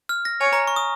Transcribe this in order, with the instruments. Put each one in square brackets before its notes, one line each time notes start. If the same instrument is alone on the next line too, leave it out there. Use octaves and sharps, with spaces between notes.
[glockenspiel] F6
A#6
[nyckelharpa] C#5 [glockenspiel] G#5
[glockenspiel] A#5
C#6
D#6